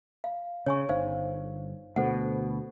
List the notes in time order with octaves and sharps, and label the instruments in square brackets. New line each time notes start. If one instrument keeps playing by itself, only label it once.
[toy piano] F5
[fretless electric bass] C#3 [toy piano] C#5 G#5 C#6
[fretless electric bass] G1 [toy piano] D#4 C5 F5
[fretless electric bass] D2 B2 [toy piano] A4 C5 F#5